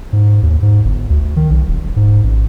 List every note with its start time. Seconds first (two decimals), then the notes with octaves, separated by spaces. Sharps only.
0.13 G#2
0.43 D#2
0.62 G#2
0.85 G1
1.10 D2
1.36 D#3
1.51 B1
1.68 D#1
1.96 G#2
2.23 A1